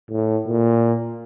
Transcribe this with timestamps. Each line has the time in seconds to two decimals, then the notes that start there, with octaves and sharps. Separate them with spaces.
0.10 A2
0.46 A#2